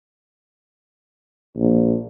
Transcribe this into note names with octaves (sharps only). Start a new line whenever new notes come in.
A#1